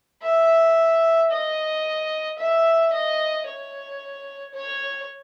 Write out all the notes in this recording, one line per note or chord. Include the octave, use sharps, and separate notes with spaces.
E5
D#5
E5
D#5
C#5
C#5